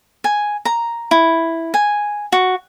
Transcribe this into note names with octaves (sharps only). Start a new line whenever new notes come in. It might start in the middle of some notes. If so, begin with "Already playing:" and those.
G#5
A#5
E4
G#5
F#4